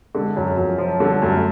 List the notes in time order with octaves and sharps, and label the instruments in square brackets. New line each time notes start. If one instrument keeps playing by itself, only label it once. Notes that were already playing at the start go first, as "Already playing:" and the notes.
[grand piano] D3 [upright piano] G#3
[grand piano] F#2 [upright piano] F#3
[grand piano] F#2 [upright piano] F3
[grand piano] F3 [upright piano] F#3
[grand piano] D3 [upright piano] G3
[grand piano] F#2 [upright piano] A3